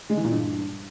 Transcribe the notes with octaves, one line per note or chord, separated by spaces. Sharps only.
G#3
E3
A#2
G2